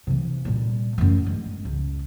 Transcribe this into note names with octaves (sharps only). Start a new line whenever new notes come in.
C3 E3
A#2 G3
F#2 A3
G1 G#3
C#2